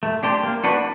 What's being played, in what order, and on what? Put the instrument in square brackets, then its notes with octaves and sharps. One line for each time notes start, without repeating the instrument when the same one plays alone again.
[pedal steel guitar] A3
D4 G4 C5
A#3
D4 F#4 B4